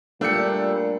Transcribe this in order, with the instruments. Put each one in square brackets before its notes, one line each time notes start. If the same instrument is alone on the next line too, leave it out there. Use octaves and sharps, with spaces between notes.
[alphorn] A#2 [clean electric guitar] G3 A3 [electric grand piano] D4 C#7